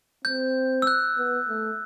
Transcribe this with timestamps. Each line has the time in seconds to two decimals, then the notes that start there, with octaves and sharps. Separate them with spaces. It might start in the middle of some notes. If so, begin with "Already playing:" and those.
0.25 C4 G6
0.82 E6
0.87 F#6
1.17 B3
1.48 A3